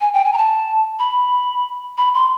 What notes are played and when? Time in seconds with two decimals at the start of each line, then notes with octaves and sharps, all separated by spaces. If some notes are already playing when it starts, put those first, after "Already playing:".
0.01 G#5
0.14 G5
0.25 G#5
0.33 A#5
0.38 A5
0.99 B5
1.97 B5
2.14 C6